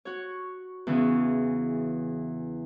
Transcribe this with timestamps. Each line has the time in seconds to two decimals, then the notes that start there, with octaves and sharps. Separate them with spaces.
0.05 F#4 C#5
0.87 E2 C#3 E3